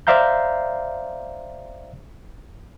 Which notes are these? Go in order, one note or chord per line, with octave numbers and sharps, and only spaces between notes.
C5 D5 E5 F5 A#5 G6